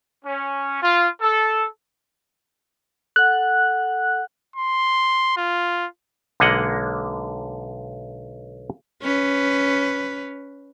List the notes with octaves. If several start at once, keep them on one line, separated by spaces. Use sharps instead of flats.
C#4
F4
A4
A4 F#5 F#6
C6
F4
B1 D3 G#3 A#3 D#5 F#5
C#4 B4